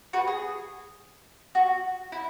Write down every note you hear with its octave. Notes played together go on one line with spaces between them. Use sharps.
F#4 B4
G#4
F#4
E4